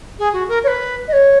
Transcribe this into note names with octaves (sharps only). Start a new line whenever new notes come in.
G#4
F#4
A#4
C#5
B4
D#5
C#5